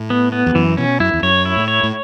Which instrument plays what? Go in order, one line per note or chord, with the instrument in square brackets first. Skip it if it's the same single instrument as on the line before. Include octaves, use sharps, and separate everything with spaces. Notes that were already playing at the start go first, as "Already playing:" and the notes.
Already playing: [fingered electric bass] A2
[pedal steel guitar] B3
B3
[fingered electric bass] E2
[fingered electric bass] F#2 [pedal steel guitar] E3
[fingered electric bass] B2 [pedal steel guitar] C#4
[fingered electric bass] F#2 [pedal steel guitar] E4
[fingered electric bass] E2
[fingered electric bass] F#2 [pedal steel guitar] C#5
[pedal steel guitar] E4
[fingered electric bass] A2
[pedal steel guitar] C#5
[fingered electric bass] A2